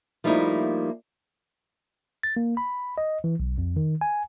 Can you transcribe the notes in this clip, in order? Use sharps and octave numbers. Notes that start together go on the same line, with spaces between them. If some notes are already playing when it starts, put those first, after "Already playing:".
F3 G3 A3 A#3 D#4 E4
A6
A#3
B5
D#5
E3
B1
F2
D#3
G#5